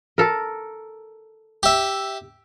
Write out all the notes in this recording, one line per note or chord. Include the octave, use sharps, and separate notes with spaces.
A4 A#4
G4 E5